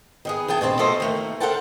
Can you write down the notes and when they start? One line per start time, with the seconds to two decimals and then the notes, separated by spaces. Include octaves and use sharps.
0.25 D#3 B3 G#4
0.48 E3 G#4 G5 A5
0.61 D2 B2 C4 A5
0.79 B2 F3 A3 A4 C5 D#5
1.00 D#3 A3 A#3
1.40 A4 A#4 C5 F#5 G5 A5